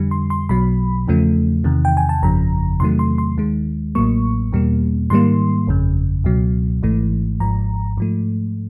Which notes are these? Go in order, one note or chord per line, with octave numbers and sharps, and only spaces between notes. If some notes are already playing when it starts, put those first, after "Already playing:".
Already playing: F2 D3 G3
C6
C6
B1 B2 F#3 B5
E2 C#3 F3 A3
E2 C3 D#3
G5
G#5
A5
G1 F2 C#3 F3 A#5
E2 C3 D#3 F#3 A3 C6
C6
C6
D#2 D#3 G#3
A1 A2 F#3 A#3 C#6
E2 B2 G3 A#3
G#2 D#3 G3 A#3 C6
G1 F2 C#3
C#2 B2 F#3
G#1 G#2 E3 A3
G#1 G#2 F3 A#5
G#2 F3 A3